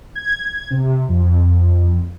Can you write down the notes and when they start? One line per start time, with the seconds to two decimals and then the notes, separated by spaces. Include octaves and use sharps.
0.15 G#6
0.71 C3
1.09 F2